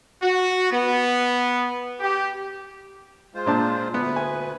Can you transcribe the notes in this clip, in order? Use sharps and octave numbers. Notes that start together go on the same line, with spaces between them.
F#4
B3
G4
G#3 F4 C5
A#2 D4 A5
D2 B3 B4
G#5